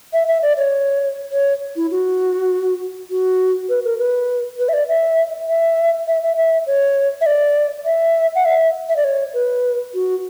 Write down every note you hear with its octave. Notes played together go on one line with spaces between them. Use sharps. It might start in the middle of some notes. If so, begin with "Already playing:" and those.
E5
E5
D5
C#5
C#5
E4
F#4
F#4
B4
A#4
B4
B4
E5
D5
E5
E5
E5
E5
E5
C#5
E5
D5
E5
F#5
E5
E5
D5
C#5
B4
F#4